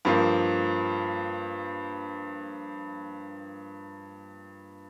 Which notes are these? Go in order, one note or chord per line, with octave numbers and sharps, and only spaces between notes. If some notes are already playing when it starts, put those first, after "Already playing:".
G2 F3 A#3